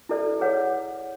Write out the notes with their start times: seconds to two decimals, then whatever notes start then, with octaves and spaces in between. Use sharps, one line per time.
0.09 E4 A4 D5
0.40 G#4 C#5 F#5